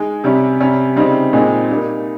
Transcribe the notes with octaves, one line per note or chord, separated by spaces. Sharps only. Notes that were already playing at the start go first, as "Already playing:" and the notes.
Already playing: G#3 D#4
C3 G3 C#4
C3 G3 C#4
C#3 G3 C4 D#4
A#2 G#3 C4 D#4
G3 A#3 D#4